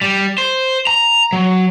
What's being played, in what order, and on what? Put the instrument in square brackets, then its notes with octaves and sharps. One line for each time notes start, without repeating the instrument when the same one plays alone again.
[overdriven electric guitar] G3
C5
A#5
F#3